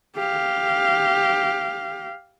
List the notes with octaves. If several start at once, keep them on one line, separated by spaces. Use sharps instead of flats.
G4 F5